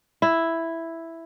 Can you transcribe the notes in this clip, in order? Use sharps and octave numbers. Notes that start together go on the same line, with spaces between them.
E4